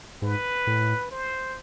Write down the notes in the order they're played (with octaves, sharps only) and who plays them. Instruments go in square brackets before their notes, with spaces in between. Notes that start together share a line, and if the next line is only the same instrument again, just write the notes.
[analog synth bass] G#2 [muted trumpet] B4
[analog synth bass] A2
[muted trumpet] C5